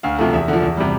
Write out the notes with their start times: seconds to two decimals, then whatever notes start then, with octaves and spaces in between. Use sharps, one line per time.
0.03 D2 F5
0.18 C3 F3 A3
0.33 E2 E5
0.48 D3 F3
0.63 E2
0.77 C3 G3